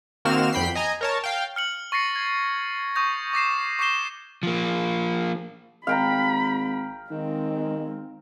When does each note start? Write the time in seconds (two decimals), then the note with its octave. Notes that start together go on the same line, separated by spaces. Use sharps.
0.25 D#3 A#3 C4 F#4 F6 E7
0.53 F2 G5 B5 B6 C7
0.75 D#5 G#5 A#5
1.01 A#4 C#5 A5
1.24 F5 G5
1.56 F6 C#7 F#7
1.92 C#6 A6 A#6 C7 C#7
2.16 G#6
2.95 C#6 D#6 G6 A#6
3.34 D6 A#6 C7 E7
3.79 C#6 D6 G6 C7 E7 G7
4.43 F3 A#3
5.87 G#1 F5 G5 A#5 B5
7.11 D#3 G#3 C4